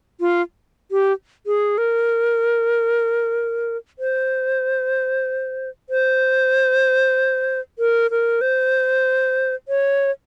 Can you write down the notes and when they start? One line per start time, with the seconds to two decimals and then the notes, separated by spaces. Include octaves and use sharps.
0.20 F4
0.91 G4
1.47 G#4
1.78 A#4
3.99 C5
5.90 C5
7.79 A#4
8.11 A#4
8.41 C5
9.68 C#5